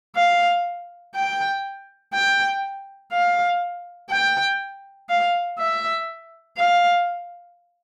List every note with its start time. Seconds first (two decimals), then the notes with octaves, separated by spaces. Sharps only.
0.16 F5
1.15 G5
2.14 G5
3.12 F5
4.10 G5
5.10 F5
5.59 E5
6.57 F5